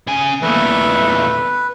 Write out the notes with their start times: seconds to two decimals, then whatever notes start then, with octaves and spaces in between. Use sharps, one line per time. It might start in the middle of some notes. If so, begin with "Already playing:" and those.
0.07 C#3 G#5
0.42 E2 A#2 A3 B4